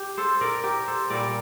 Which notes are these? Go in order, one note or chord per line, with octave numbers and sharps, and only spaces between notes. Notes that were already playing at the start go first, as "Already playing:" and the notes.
Already playing: G4
A4 C5
A#4 D5
G4 A#4
A4 C5
A#2 G3 A#4 D5